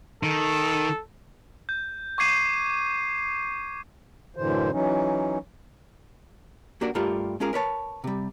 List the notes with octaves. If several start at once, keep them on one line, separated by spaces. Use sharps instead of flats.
D#3 A4
G6
C#6 D6 G#6 C7 D#7
F#2 A2 D3 E3 C5
E3 F#3 C#4 D#4
A#3 D4 F#4 G4 A#4 D5
G2 G3 A3 F4 A#4 D5
G#3 C#4 F4 G#4 A#4
A#4 B4 C#5 A5
C3 G3